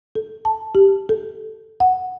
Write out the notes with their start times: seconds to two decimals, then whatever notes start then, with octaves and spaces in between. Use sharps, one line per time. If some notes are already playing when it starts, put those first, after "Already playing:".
0.15 A4
0.45 A5
0.75 G4
1.09 A4
1.80 F#5